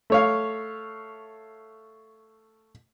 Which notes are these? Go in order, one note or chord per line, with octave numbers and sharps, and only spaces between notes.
A3 C#5 F5